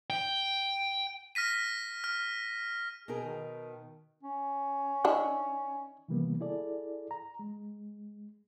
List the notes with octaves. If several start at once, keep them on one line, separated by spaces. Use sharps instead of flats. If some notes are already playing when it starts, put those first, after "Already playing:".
G5
F6 A#6 B6 D#7
F6
B2 D#4 G#4 A#4
D#3
C#4
D#3 D4 E4
C3 D#3 E3 G3 A#3 B3
E4 G#4 A4 D5
A#5
G#3